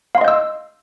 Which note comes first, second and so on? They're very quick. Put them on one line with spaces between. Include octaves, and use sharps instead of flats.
F5 C6 D#5 G6 E6